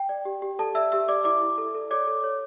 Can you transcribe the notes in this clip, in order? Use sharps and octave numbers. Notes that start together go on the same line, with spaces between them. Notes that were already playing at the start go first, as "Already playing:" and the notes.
Already playing: G5
D5
G4
G4
A4 D5 A5
D5 E5 E6
G4 E5 E6
D5 D6
E4 D5 D6
E4
A4
A4
C#5 D5 D6
A4
C#5